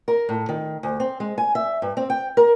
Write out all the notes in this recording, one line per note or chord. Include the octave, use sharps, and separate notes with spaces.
A#4
A2
D#3
D2
C4
G#3
G#5
E5
G2
C4
G5
A#4